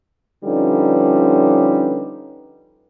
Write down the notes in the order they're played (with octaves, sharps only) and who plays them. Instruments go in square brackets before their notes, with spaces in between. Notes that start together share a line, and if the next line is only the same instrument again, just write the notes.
[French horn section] D3 F3 G3 C#4 D#4 B4